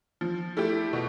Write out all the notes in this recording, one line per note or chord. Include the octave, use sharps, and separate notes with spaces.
F3
A3 E4 G4
B2